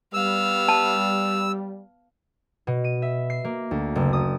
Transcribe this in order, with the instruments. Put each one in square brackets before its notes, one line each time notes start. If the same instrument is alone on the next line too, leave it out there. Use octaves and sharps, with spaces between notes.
[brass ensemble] G3 [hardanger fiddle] B3 F5 [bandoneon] E6
[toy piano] A5
[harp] B2
D#7
E5
C7
A#3
D2
F#1
D#6